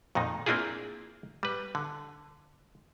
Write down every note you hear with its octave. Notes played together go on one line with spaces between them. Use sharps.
F2 A#2 D#3 D#4
A#3 C4 D4 E4 F4 G#4
G3 B4
D3